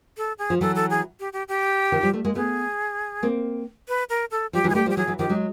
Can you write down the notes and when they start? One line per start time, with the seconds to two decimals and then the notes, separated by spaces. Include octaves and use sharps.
0.17 A4
0.39 G#4
0.50 F3
0.61 E3 F#3 A4
0.75 A4
0.90 G#4
1.20 G4
1.33 G4
1.48 G4
1.92 D#3 F3
2.03 F3 G3
2.13 G3 A3
2.25 G#3 A#3
2.35 A3 B3 G#4
3.23 A#3 C4
3.88 B4
4.10 A#4
4.31 A4
4.53 F3 G3 G4
4.64 E3 F#3
4.70 G#3 G#4
4.75 G3 A3 G4
4.86 F3 G3
4.90 G4
4.97 E3 F#3 G#4
5.08 E3 F#3
5.19 D#3 F3 G4
5.29 F#3 G#3